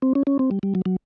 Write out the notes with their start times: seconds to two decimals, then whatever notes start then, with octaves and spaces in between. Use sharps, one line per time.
0.02 C4
0.15 C#4
0.27 C#4
0.39 C4
0.51 G3
0.63 G3
0.75 F#3
0.86 F#3